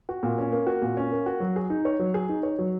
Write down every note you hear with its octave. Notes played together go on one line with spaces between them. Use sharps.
F#4
A#2
C#4
A#3
F#4
A#2
C#4
A#3
F#4
F#3
G#4
D#4
C#5
F#3
G#4
D#4
C#5
F#3